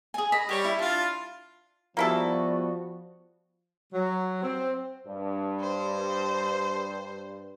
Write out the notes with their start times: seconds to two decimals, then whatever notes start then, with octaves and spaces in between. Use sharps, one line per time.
0.14 G#4 G#5
0.32 D#5 B5
0.49 G3 G4 C#5 C#6
0.65 E4
0.79 D4 F4 F5
1.97 F3 G3 A#3 B3 E4 F#4 A4
3.93 F#3
4.43 C4
5.07 G2
5.60 C5